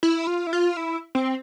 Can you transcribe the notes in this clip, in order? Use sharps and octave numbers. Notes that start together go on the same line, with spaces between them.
E4
F4
E4
F4
E4
C4